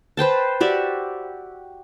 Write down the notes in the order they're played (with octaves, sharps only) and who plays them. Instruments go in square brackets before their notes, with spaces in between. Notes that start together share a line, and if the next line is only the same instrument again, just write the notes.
[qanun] B4 C5 G5 A5
F#4 G4 D5 E5